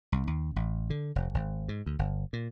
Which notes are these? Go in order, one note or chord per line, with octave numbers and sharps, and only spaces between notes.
C2
D#2
A1
D3
F1
G#1
G#2
D2
G1
A#2